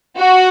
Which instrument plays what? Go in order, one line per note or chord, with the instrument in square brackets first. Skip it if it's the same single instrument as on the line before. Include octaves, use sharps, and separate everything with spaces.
[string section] F#4